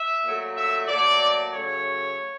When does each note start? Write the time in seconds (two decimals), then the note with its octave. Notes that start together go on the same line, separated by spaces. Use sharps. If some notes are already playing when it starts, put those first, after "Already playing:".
Already playing: E5
0.23 A#2 F#3 A3
0.57 E5
0.88 A#2 F#3 A3 D5
1.53 C#3 F#3 A3 C#5